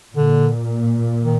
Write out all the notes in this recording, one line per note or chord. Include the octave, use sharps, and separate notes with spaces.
A#2 D3
D#3